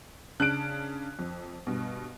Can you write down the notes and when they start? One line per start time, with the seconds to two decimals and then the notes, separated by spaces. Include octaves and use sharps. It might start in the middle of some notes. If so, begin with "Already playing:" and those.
0.40 C#3 D4 A5 F#6 D7
1.19 F2
1.67 G2 B2